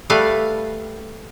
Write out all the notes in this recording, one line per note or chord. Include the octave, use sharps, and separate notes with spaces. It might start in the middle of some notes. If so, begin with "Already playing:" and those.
G3 A3 A4 B4 F5